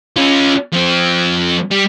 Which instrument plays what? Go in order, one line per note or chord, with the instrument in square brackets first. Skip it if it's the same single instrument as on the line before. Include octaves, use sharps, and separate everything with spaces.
[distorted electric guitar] C#4 F4
F3 C4
G3